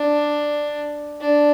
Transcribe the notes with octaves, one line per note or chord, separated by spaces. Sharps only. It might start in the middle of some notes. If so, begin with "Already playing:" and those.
Already playing: D4
D4